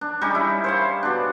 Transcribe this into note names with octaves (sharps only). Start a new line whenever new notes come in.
D4
G3 C#4 D#4 G#4
E4
C5 C#5 F5
B2 D4